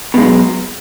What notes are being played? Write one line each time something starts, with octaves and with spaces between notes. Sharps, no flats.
B2 D3 F#3 G#3